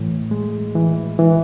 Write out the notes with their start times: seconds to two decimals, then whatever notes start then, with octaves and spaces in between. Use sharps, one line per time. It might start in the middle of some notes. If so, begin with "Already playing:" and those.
Already playing: A2 E3
0.31 G#3
0.75 E3
1.19 E3